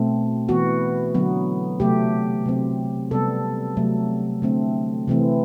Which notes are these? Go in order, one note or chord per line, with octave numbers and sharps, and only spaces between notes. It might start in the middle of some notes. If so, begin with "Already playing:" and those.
Already playing: B2 A3 C4
E3 B3 F#4
D3 F#3 B3
C3 F#3 A3 G4
C3 F#3 C4
C3 G3 B3 A4
C3 F#3 A3
D3 A3 C4
C3 E3 A3 C4